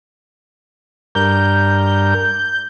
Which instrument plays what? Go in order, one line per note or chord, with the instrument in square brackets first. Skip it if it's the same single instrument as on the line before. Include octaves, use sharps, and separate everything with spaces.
[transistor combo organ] G2 A#4 [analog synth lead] G6